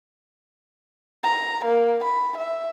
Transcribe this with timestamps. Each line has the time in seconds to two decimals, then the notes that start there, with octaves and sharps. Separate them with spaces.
1.23 A#5
1.65 A#3
2.04 B5
2.37 E5